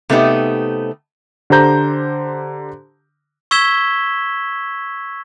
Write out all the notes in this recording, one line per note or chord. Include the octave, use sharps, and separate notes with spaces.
C3 A3 B3 D#4 G4
D3 G4 C5 A#5 G6
C#6 E6 G#6 B6 E7 G7